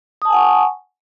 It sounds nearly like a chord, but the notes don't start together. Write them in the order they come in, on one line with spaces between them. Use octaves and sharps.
D#6 A5 G#5 F#5 C#6